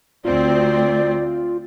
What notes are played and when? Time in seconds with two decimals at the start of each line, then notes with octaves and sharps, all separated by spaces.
0.25 D2 C4 F4 D5